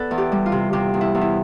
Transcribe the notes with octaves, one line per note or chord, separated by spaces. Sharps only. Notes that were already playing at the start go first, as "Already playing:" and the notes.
Already playing: B3 A4 B4 D5
E2
G4
G3
F4
C3
C3 G4
E2
E4
E2
E4